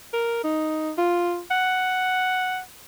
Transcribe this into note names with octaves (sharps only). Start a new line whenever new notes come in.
A#4
D#4
F4
F#5